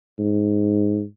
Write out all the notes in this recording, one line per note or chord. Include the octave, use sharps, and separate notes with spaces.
G#2